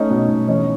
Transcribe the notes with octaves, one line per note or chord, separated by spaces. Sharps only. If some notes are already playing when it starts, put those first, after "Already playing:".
Already playing: A3 C#4 D#4
B2
B2
E3 C#4 D#4